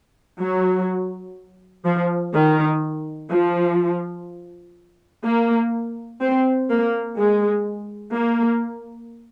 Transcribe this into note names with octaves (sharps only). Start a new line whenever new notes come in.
F#3
F3
D#3
F3
A#3
C4
A#3
G#3
A#3